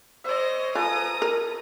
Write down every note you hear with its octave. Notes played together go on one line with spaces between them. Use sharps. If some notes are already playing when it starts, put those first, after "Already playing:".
C5 C#5 D#5 E5
F4 A4 B4 G#5 A#5 D#6
A#4